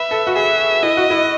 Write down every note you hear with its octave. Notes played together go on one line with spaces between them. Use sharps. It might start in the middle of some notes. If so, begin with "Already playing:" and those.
Already playing: B4 E5
A4
F#4
G#4 E5
E4 D#5
F#4
E4